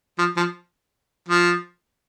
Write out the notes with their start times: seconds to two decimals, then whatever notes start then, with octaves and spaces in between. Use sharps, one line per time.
0.18 F3
0.37 F3
1.29 F3